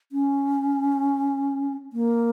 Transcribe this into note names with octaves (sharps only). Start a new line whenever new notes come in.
C#4
A#3